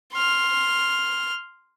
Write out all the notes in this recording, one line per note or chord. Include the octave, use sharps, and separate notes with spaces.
C6 F6